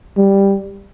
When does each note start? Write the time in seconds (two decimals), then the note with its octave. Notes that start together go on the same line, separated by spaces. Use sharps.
0.17 G3